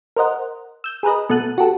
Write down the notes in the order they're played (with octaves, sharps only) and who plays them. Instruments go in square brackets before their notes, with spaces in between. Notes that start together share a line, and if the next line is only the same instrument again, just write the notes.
[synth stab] A#4 C5 D#5 F#5
E6 G6
G#4 A#4 B4 D#5
B2 A3 A5 F#6 D#7
F#4 G4 A4